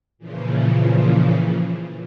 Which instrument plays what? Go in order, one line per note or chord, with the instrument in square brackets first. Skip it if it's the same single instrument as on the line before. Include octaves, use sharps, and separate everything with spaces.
[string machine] A#2 C#3 E3 F3